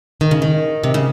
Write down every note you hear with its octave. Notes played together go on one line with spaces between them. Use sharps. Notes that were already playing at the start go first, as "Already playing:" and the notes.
D#3
C#3
D#3
C3
C#3